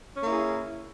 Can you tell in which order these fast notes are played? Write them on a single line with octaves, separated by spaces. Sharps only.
C#4 A#3 E4 G#4